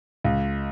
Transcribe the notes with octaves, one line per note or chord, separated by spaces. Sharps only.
C#2